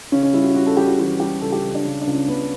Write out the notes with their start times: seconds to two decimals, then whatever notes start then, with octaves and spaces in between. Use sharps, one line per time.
0.12 C#3 C#4
0.23 C#4
0.33 G3 E4
0.44 F#4
0.55 G3 F#4
0.66 A4
0.77 G3 G4
0.87 F#4
0.98 E3 F#4
1.20 G3 G4
1.41 C#2 A4
1.52 G4
1.63 C#2
1.75 D4
1.84 C#3
2.01 D4
2.07 C#2
2.15 C#4
2.28 C#2 B3